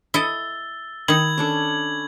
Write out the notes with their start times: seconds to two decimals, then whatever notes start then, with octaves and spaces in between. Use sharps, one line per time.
0.14 E4 A4 D#5 E6 A6 G7
1.08 D#3 D#4 B5 G#6 F#7
1.38 C#4 D4 A4